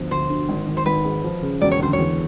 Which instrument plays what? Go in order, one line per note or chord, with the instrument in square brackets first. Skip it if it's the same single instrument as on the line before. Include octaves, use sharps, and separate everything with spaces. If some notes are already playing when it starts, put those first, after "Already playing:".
Already playing: [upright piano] D2 B2 F3
[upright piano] D2 [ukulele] C5
[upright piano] D3
G#1
D#3
[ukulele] C5
[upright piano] G#1 [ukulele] B4
[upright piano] G#2
F3
C#3
[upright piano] E1 [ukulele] D5
[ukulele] C#5
[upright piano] D2 [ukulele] C5
[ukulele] C#5
[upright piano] E2